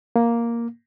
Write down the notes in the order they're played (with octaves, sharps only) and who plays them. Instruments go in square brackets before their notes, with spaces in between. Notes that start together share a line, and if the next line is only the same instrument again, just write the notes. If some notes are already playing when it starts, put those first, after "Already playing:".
[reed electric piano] A#3